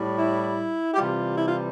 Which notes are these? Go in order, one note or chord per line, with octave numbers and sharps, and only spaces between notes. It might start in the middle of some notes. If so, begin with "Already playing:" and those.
Already playing: A2 G3
E4
G4
C3 E3 G3 F4
E4
F4